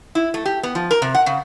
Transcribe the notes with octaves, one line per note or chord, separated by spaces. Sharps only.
E4
A3
G4
B3
F3
A#4
C3
F#5
C#3